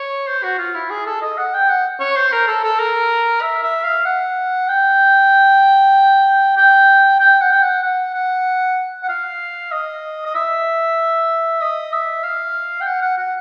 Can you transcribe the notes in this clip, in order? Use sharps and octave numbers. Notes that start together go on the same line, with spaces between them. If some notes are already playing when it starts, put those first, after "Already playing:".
Already playing: C#5
C5
F#4
F4
E4
G#4
A4
D#5
F#5
G5
F#5
C#5
C5
A#4
A4
A4
A#4
E5
E5
F5
F#5
G5
G5
G5
F#5
G5
F#5
F#5
F#5
F#5
F5
D#5
D#5
E5
D#5
E5
F5
G5
F#5
F#5
F#5